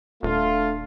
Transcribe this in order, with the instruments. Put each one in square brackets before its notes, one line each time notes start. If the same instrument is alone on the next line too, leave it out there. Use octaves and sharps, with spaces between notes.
[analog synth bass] D#1 [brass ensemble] A3 D4 F4